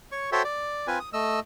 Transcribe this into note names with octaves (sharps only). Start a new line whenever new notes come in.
C#5 C#6
F#4 A4 C5 C#5 E5 G5
D5
C4 F4 B4 G#5
D#6
A3 D#5 E6